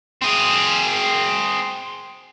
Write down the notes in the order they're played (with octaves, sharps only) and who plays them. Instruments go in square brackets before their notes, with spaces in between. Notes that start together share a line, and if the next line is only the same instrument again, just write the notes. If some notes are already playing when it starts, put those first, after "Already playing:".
[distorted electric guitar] C4 G#4